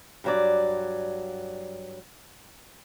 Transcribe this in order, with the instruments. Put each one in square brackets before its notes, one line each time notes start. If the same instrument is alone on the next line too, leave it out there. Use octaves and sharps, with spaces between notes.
[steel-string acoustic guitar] G2 F#3 D5